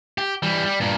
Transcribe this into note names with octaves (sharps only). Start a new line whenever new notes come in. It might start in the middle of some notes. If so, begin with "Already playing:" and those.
G4
E3 G3
G3
G2 A#2